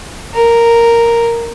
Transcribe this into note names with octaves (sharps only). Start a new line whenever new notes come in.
A#4